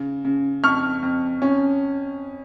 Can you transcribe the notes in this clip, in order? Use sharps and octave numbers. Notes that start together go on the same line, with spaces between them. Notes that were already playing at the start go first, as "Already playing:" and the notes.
Already playing: C#3
C#3
F2 C#6 F6
F2
C#4